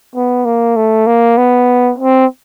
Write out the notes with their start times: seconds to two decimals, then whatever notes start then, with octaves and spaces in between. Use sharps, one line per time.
0.16 B3
0.45 A#3
0.76 A3
1.07 A#3
1.37 B3
1.98 C4